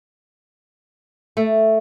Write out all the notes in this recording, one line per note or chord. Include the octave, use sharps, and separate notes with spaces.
A3